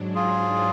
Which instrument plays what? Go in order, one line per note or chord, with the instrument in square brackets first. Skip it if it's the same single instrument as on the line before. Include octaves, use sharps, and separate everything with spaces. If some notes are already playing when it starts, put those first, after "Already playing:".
Already playing: [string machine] G#2 F#3 D4
[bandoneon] F4 G#4